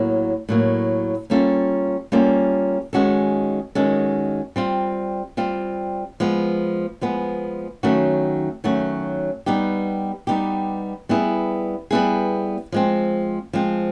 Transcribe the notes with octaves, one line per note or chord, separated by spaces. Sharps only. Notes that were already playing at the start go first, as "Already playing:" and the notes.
Already playing: A2 F#3 A#3
A2 F#3 A#3
G3 A#3 C#4 F4 A4
G3 A#3 C#4 F4 A4
D#3 G#3 C#4 F#4 A4
D#3 G#3 C#4 F#4 A4
G3 C4 F4
G3 C4 F4
F3 G#3 B3
F3 G#3 B3
D#3 F#3 A3 C#4 F#4
D#3 F#3 A3 C#4 F#4
G3 B3 D#4 G4
G3 B3 D#4 G4
G3 B3 E4 G#4
G3 B3 E4 G#4
F3 G#3 C4
F3 G#3 C4